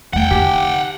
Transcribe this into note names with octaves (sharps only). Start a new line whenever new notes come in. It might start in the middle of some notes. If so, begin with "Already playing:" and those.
E2 A3 F#5 G5
D3 D#4 G4